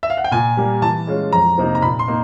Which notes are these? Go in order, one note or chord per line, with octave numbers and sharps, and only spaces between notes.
E5
F5
F#5
G5
A#2 G#5
G3 A#3
E3 A5
G#3 C#4 F4
F2 A#5
C3 F3 A#3 D#4
A#5
A#2 B5
C6
A#3 D#4